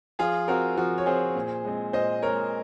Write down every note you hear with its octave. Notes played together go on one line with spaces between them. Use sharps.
F3 F4 G#4
C4 F#4 A#4
F3 F#4 A#4
C#5
C4 G#4 C5
A#2
G#3 C4
A#2 C5 D#5
G#3 C4 A#4 C#5